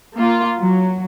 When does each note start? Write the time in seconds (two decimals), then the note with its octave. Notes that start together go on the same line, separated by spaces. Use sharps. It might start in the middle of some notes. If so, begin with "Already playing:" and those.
0.16 A#3 F4
0.58 F#3